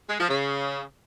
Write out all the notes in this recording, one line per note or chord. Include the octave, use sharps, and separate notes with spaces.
G#3
F3
C#3